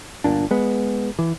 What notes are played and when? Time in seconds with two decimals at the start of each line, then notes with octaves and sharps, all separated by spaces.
0.24 G1 A#2 D4
0.51 G#3 B3
1.19 E3